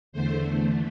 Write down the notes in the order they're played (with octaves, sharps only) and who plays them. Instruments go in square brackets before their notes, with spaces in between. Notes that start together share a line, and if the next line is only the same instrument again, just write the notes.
[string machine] E2 D3 A3 C5